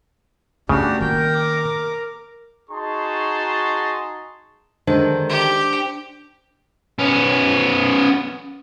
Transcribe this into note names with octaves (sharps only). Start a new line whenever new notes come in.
C#3 A3 B3 D4 F#4 G4
D#3 A#3 A#4 G5
D6
D#4 F#4 G#4 A5 C6 C#6
D3 D#3 G#3 D4 C5
G4
B3 C#4